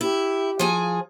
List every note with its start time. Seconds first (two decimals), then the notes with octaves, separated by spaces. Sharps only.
0.01 E4 G4
0.59 F3 G#4 G#5